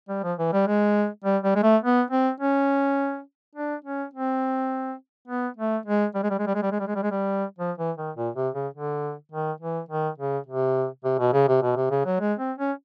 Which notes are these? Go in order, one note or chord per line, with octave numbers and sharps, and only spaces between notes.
G3
F3
E3
G3
G#3
G3
G3
G#3
A3
B3
C4
C#4
D4
C#4
C4
B3
A3
G#3
G3
G#3
G3
G#3
G3
G#3
G3
G#3
G3
G#3
G3
G#3
G3
F3
E3
D#3
A#2
C3
C#3
D3
D#3
E3
D#3
C#3
C3
C3
B2
C#3
C3
B2
C3
C#3
F#3
G#3
C4
C#4